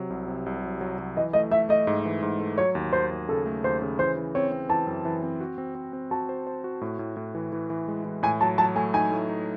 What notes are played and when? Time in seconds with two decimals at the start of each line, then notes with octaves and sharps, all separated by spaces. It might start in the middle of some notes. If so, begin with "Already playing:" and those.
Already playing: C3 F#3
0.10 C2
0.28 C3
0.46 C2
0.64 F#3
0.81 F#3
0.99 F#3
1.17 E3 D#5
1.33 A3 D#5
1.51 A3 E5
1.69 A3 D#5
1.87 G#2
2.05 E3
2.22 G#2
2.40 A3
2.58 F#3 C#5
2.75 D#2
2.93 D#2 C5
3.11 D#2
3.29 C#3 A4
3.46 A3
3.64 D#2 C5
3.82 C#3
3.99 E3 C5
4.17 E3
4.35 C4 C#5
4.52 C4
4.69 E3 A5
4.87 F#2
5.05 E3
5.23 C4
5.40 F#4
5.58 C4
5.75 C4
5.93 C4
6.11 F#4 A5
6.29 C5
6.47 C5
6.64 F#4
6.81 A2
6.99 A2
7.17 A2
7.35 E3
7.53 E3
7.70 E3
7.88 G#3
8.05 E3
8.23 A2 G#5
8.41 F#3 A5
8.58 F#3 A5
8.76 A3 G#5
8.94 D#4 G#5
9.12 A2
9.29 D#4